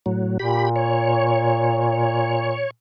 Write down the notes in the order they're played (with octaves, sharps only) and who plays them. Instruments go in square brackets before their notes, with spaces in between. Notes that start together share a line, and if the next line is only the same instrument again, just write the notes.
[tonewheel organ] A2 F#3
[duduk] A#2 [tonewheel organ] G4 B5
[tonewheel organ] C#5